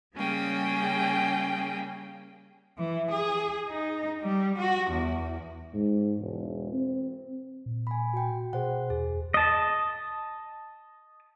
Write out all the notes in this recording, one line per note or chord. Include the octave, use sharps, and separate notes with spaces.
C#3 G3 A#3 C#4 G#4 G5
E3
G#4
D#4
G3
F#4
E2
G#2
E1
C4
A#2
G#5 B5
F#4 G5
B2 G#4 C5 F#5
E2 G#4
D#5 A5